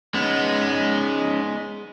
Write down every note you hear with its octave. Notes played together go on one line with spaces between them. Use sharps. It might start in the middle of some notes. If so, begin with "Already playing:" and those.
G#3 B3 C#4 D#4